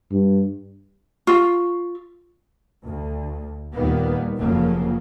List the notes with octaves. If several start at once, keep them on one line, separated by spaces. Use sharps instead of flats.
G2
F4 C#6
D2
D#2 A#2 D#3 G3 A#3 B3
F1 F2 C#3 F3 F#3 A#3